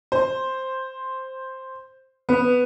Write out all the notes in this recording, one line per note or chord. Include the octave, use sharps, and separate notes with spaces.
C5
B3